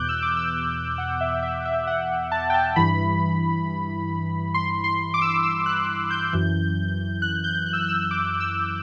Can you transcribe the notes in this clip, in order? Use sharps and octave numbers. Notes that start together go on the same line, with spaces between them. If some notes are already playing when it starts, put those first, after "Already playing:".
Already playing: E2 B2 D6 F#6 G6
E6
D6
E6
F#5
E5
E5
E5
F#5
A5
G5
A5
G2 E3 B5
C6
C6
D6
E6
D6
E6
F#6
G6
F#2 E3
F#6
G6
F#6
E6
F#6
E6
D6
E6